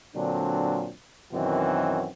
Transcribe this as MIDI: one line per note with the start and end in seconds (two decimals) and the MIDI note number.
0.16 0.92 46
0.16 0.92 50
0.16 0.92 54
0.16 0.92 60
0.16 0.92 62
1.33 2.09 42
1.33 2.09 47
1.33 2.09 51
1.33 2.09 52
1.33 2.09 60
1.33 2.09 66